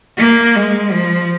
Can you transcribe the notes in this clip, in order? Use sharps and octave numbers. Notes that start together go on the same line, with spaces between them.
A#3
G#3
F3